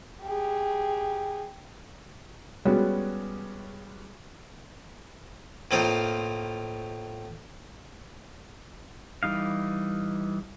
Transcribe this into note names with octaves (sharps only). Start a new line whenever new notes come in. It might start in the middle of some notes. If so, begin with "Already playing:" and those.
G4 G#4
G3 G#3 B3 C#4 F#4
A2 A#3 C4 D#4 F4
E3 G3 D#4 F5